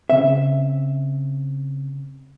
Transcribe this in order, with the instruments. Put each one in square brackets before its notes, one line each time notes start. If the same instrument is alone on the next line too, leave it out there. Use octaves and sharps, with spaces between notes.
[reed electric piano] C#3 C4 [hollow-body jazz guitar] E5